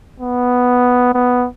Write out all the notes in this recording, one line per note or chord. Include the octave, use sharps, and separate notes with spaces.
B3
B3